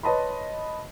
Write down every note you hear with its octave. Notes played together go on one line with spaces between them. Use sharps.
B4 C#5 D#5 A5 B5 C6